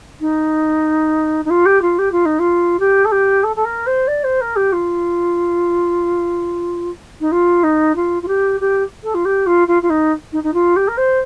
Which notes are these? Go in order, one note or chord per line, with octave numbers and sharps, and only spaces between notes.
D#4
D#4
F4
G4
F4
G4
F4
D#4
F4
G4
A4
G4
A4
A4
A#4
C5
D5
C5
A#4
G4
F4
D#4
F4
D#4
F4
F4
G4
G4
A4
F4
G4
F4
F4
F4
D#4
D#4
D#4
F4
G4
A#4
C5